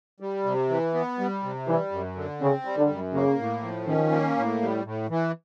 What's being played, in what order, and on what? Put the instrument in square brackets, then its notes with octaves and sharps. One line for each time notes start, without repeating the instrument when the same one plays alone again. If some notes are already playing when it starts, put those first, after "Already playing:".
[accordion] G3
C3
E3
B3
G3
C3
[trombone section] E3 [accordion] G3
[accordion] F#2
D3
[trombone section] C#3 [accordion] C4
[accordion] G3
[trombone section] D3
[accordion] F#2
[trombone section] C#3 [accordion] A#3
[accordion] A2
F3
[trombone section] D#3 [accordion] C#4
[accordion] A#3
A2
G3
A2
E3